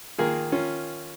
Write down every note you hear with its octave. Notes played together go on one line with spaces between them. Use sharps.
D#3 A#3 F4 G#4
C#4 F4